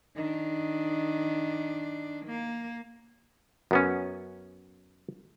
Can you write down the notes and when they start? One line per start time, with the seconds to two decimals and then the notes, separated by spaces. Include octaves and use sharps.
0.16 D#3 D4
2.26 A#3
3.71 F#2 B3 C#4